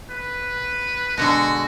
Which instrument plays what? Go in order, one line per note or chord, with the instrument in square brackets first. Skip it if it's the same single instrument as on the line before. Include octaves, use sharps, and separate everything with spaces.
[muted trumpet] B4
[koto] B2 D3 G#3 [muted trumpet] F#4